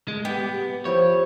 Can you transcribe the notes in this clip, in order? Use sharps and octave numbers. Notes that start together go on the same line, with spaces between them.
G#3
B3 G4
F3 E4 C#5 G5